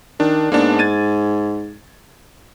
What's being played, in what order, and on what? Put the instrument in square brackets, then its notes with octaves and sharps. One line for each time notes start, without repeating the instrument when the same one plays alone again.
[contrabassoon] D#3 [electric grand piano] D4
[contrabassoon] G#2 [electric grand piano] A#3 B3 D4
[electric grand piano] G#6 A6 D#7